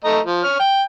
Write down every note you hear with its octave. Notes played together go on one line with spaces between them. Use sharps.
A3 D#5 A#5
F3
C#5 F6
G5